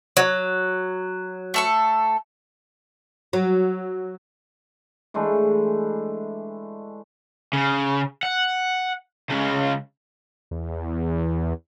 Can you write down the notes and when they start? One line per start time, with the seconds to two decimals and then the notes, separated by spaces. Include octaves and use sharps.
0.17 F#3
1.54 A3 A4 C#6
3.33 F#3
5.14 E3 G#3 A3 D4
7.53 C#3
8.23 F#5
9.30 C#3 G#3
10.51 E2